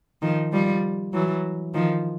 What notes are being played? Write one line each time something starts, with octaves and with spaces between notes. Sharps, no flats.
D#3 F3
F3 G3
E3 F#3
D#3 F3